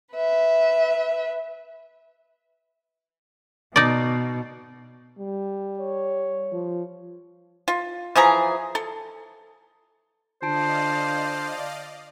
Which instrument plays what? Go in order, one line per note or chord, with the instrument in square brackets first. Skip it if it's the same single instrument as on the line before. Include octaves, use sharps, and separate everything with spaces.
[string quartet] B4 E5
[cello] B2 [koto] D#4 D5
[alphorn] G3
[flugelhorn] C#5
[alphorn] F3
[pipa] F4
E3 F3 G#4 A#5
A4
[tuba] D3 [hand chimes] F4 A5 D7 [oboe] C5 [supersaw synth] D5 D#5 F5